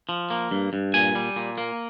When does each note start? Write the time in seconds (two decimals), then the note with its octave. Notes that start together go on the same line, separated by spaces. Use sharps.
0.09 F3
0.30 A#3
0.51 G2
0.73 G2
0.94 A#2 G#5
1.15 G3
1.36 A#2
1.58 A#3